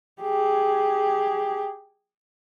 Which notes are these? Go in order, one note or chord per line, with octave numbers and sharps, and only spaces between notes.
G4 G#4